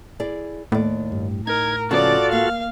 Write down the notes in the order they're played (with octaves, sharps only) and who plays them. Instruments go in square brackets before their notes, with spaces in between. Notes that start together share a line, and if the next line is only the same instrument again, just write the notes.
[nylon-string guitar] E4 G#4 D5
[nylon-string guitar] D#2 D5 [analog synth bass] A2
[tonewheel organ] G2
[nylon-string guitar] D#4 [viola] A#4 [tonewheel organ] G#6
[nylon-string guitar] C#3 F3 B3 [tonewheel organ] F4 F#4 A4 [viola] D5
[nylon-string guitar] A#3 [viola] F5